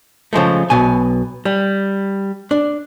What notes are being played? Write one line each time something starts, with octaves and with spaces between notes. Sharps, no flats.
C#3 F3 G#3 A3
B1 B2 G#5
G3
D4